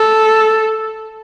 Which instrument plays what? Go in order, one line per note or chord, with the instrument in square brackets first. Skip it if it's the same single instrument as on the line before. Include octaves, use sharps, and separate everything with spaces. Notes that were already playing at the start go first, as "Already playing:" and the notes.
Already playing: [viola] A4